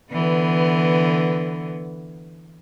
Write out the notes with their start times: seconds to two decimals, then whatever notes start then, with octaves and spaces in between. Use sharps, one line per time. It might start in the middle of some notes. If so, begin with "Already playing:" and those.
0.12 D3 E3 B3